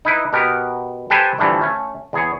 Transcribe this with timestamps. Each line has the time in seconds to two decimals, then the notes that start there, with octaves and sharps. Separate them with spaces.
0.05 D#4 E4 B4
0.33 B2 B3 G4 A#4
1.10 G4 A4 B4 C5 G5 G#5
1.38 G2 D3 E3 F3 A3
1.61 A3 C#4
2.13 E2 G#4 C#5